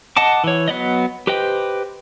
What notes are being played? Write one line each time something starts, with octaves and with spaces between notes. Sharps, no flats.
D#5 F#5 A5 D6
E3 C#5
F#3 B3 D5 D#5
G4 B4 C5 D#5 G5